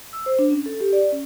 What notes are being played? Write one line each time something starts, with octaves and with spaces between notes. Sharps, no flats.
E6
C5
D4
C#4
A4
G4
D5
C#4